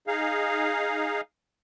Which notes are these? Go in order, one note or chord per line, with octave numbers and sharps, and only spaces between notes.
D#4 G#4 F5